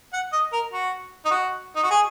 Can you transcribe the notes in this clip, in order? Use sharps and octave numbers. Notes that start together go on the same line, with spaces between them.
F#5
D#5
A#4
F#4
D#4
F#4
D#4
F#4
G#4